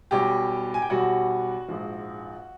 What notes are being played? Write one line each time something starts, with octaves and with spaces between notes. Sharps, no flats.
B1 B2 G3 G4 G5
G#5
G5
B1 B2 G3 F#4 F#5
A#1 G#2 F3